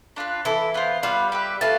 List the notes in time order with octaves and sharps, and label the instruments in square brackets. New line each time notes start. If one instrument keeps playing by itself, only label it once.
[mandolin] D4 F4 B4
[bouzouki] E3 [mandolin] E4 A4 E5
[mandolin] B3 F4 C5
[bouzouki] G3 [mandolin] B3 F4 B4 F5
[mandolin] G4 B4 E5
[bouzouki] A3 [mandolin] F4 B4 F5 A5